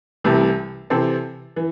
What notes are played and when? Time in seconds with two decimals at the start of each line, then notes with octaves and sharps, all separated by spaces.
0.24 C2 C3 E3 A3
0.90 C3 E3 C4 A4
1.56 E3